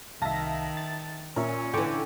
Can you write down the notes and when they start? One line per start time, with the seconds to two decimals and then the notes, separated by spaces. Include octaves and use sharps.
0.22 C2 D#3 E5 F5 A5 A#6
0.77 A6
1.36 A#2 C#4 A#4 C#5 E5
1.74 D3 E3 G5 C#6 D6